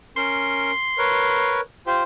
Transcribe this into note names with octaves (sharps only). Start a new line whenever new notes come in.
C#4 A#4 C6
A#4 B4 C#5
F4 G4 C5